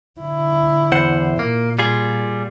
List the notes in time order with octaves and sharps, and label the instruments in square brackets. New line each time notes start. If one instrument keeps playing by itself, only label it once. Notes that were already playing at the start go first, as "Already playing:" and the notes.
[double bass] D3 E4
[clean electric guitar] E2 C5 F#5
[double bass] A#2 [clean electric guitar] A#3
[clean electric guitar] G3 F4 G#4